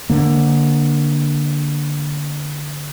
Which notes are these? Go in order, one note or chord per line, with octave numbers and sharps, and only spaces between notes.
D3 A#3